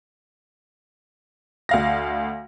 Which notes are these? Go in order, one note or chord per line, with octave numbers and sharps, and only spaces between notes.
D2 F5 A#6